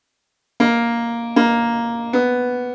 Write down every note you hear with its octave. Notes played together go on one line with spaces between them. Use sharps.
A#3
A#3
B3